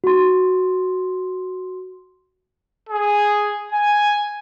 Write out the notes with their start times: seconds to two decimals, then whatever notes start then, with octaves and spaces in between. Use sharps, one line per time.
0.04 F#4 C6
2.89 G#4
3.73 G#5